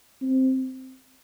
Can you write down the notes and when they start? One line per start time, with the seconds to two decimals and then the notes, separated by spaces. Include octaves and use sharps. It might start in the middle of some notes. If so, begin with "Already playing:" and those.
0.22 C4